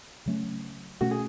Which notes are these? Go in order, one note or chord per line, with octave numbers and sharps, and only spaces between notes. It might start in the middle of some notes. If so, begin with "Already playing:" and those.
C#3 F#3 A3 C#4
B2 A3 C#4 F#4
G#4